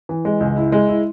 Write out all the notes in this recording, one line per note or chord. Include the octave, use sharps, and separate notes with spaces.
E3
G#3
C#2
E4
G#3
E4